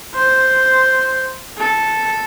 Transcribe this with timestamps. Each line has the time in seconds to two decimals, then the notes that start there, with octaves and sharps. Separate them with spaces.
0.15 C5
1.57 A4